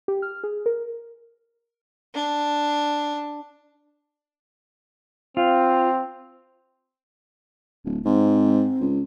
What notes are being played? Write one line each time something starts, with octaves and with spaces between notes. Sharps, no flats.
G4
F6
G#4
A#4
D4
C4 F4
D1
G#2 C4
C#2